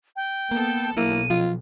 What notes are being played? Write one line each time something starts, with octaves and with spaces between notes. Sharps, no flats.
G5
A#3 B3 A4
B1 A#3 E4 D#7
F3 F4